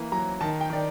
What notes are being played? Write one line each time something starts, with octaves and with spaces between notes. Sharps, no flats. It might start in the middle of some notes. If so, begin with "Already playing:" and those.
Already playing: E3 A#3
F#3 A#5
D#3 A5
G5
D#3 D5